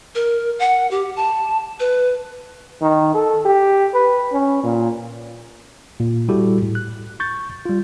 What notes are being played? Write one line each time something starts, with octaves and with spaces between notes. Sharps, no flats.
A#4
F#5
G4
A5
B4
D#3
A4
G4
B4
C#4
A#2
A#2
G3 E4 F#4 G4 A4
A2
F#6
C#6 G6 A6
G3 F4